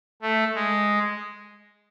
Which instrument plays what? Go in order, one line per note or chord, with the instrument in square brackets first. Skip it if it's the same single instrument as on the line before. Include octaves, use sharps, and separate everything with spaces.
[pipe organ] A3
G#3